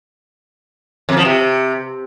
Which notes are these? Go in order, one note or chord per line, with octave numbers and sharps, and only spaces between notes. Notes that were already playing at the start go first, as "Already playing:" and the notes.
F2
F3
C3